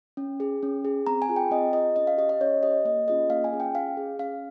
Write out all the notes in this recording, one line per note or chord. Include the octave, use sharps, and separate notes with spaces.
C#4
G#4
C#4
G#4
C4 A#5
G#5
F4 G#4
G5
C4 D#5
F4 G#4 D#5
C#4 D#5
F5
G4 D#5
D#5
C#4 C#5
G4 D#5
A#3 D#5
C#4 F4 G#4 D#5
A#3 F5
G#5
C#4 F4 G#4
G5
C#4 F5
G#4
C#4 F5